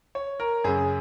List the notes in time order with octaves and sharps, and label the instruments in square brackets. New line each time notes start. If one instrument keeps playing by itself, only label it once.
[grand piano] C#5
A#4
F#2 C#3 G#4